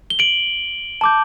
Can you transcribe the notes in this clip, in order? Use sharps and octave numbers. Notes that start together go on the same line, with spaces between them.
G7
D7 F#7
A5 D6 G6